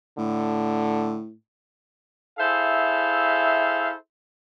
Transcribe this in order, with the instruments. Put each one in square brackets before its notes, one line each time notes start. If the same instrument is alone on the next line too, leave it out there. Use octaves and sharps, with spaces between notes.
[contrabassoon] A2 [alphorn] D3
[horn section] E4 G#4 A4 C5 E5 F5